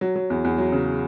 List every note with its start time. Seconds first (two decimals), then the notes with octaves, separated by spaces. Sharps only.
0.01 F#3
0.16 F#3
0.30 E2
0.45 E2
0.58 F#3
0.73 C#3